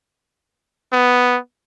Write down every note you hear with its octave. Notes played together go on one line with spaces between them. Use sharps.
B3